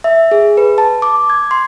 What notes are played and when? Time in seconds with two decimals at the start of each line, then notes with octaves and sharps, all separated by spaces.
0.04 E5
0.31 G#4
0.57 B4
0.78 A5
1.02 D6
1.30 G#6
1.51 C6